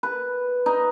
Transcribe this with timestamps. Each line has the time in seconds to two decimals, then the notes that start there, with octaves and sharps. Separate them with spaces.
0.03 B4
0.66 D#4